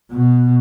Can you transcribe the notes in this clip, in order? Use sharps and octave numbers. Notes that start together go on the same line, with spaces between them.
B2